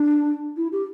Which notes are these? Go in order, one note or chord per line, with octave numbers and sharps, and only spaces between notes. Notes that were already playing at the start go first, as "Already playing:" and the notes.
Already playing: D4
E4
G4